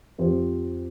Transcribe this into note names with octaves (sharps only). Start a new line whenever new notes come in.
F2 F3 C4 G4 C5